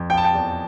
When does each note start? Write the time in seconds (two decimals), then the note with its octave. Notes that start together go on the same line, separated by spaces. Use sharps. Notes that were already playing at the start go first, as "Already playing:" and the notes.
Already playing: F2
0.10 F3 G5
0.17 A5
0.24 G5
0.34 E2